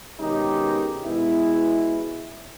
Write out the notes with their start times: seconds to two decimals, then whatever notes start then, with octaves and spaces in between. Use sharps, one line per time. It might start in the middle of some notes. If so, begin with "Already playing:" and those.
0.20 B2 D#3 G#3 C#4 D#4 G4
1.05 B2 G#3 B3 E4